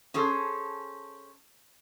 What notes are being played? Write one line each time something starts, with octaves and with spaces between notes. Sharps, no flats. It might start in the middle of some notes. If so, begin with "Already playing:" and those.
C#4 G#4 A4 C5